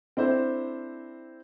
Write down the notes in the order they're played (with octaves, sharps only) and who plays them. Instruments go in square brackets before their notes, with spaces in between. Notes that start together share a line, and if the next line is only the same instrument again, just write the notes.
[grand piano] C4 D4 E4 A4 C5